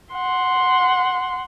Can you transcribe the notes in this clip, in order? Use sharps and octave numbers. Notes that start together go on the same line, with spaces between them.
F#5 C6